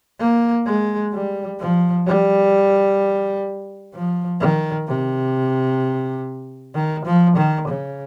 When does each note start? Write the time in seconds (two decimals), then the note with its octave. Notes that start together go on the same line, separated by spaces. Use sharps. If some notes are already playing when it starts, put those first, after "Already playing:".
0.19 A#3
0.66 G#3
1.13 G3
1.60 F3
2.06 G3
3.94 F3
4.40 D#3
4.87 C3
6.75 D#3
7.05 F3
7.36 D#3
7.68 C#3